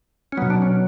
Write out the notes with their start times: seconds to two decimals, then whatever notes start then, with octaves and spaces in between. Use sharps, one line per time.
0.32 C#4
0.37 F#3 B3
0.42 B2
0.50 D4
0.62 C#4